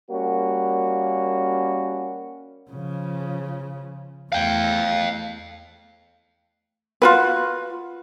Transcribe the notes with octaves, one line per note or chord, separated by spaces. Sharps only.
G3 A#3 C#4 F#4
C#3 F3
E2 A3 F5 G5
F4 F#4 B4